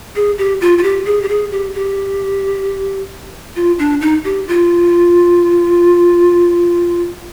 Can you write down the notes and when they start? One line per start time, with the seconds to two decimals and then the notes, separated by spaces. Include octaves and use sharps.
0.16 G#4
0.38 G4
0.61 F4
0.78 F4
0.83 G4
1.06 G#4
1.22 G4
1.29 G#4
1.52 G4
1.75 G4
3.56 F4
3.79 D4
4.01 D#4
4.24 G4
4.48 F4